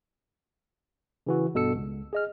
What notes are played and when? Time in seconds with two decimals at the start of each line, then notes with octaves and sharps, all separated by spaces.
1.26 C#3 E3 F#4
1.54 G#1 G2 B2 A4 E6 C#7
1.75 C#2
2.13 G#4 D#5 F6